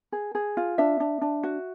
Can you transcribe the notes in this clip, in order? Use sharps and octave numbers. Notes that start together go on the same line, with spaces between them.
G#4
G#4
F4
D4 E5
D4
D4
F#4